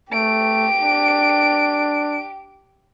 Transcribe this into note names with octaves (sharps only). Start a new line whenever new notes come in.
A3 G4 D7
D4